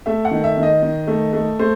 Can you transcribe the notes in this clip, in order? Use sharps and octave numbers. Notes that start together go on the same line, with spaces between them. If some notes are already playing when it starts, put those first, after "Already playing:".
A3 E5
F#5
D#3
E5
D#3
D#5
D#3
A3
A3
A3 C5